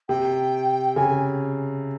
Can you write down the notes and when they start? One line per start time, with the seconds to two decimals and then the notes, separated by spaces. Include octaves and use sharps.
0.08 C3 G5
0.95 C#3 G#5